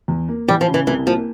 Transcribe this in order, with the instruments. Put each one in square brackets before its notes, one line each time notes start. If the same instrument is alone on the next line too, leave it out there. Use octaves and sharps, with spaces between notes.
[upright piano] E2
A#3
[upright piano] E3 [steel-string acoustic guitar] G3
[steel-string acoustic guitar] F3
[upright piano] C#3
[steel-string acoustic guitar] E3
[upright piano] C2 [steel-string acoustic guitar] E3
[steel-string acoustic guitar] F3 [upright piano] A#3